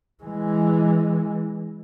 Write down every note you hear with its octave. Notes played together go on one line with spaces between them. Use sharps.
E3 G#3